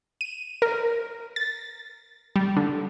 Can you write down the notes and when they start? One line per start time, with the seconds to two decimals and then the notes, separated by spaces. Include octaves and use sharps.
0.21 D#7
0.62 A#4
1.36 A6
2.36 G3
2.57 D3